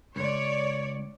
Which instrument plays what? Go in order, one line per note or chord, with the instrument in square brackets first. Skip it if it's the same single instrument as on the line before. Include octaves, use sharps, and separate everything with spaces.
[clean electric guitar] C#2 [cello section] C#5 D5